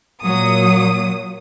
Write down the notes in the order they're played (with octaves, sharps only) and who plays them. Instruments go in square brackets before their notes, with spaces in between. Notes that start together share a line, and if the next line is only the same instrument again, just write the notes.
[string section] A#2 F#3 D#6